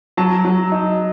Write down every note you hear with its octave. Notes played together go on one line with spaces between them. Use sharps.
F#3 A5
F#3
D#4